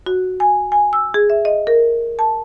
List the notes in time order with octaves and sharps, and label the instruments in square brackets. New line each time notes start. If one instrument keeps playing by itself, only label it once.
[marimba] F#4
G#5
G#5
E6
G#4
E5
D#5
A#4
A5